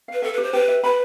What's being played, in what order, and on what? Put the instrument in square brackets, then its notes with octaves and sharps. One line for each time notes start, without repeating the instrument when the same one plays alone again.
[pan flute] B4 [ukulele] F5
[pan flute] A4 [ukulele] E5
[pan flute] B4
[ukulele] G4
[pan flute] C5
[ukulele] G4 [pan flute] B4
[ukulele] E5
[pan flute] B4 [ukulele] B5